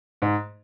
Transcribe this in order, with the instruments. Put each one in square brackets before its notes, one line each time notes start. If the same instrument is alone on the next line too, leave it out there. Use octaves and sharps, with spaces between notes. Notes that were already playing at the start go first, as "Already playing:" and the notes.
[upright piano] G#2